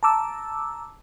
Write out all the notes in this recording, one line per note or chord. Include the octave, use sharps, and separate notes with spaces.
A5 A#5 D6 E6